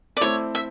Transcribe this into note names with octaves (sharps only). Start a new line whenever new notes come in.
D5
A3 C4 E4 A4 C#5
E5